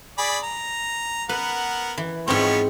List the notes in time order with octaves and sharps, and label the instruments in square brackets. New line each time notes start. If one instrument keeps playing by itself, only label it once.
[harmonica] G#4 D5 B5
A#5
[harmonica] B3 A#4 F#5 [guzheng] B4
[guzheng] E3
[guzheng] G#2 C4 [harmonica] F3 B3 C#5